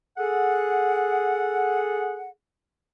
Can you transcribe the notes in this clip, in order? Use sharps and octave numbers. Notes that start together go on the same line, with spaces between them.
G#4 A4 F#5